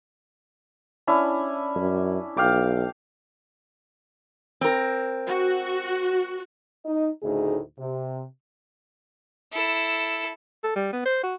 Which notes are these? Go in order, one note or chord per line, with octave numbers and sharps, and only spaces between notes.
C#4 D4 E4
F#2
B1 F5 G5 D6
C4 A#4
F#4
D#4 D#5
D2 A2 C#3 D#4 G#4 D#5
C3
E4 A4
A4
G3
B3
C5
F#4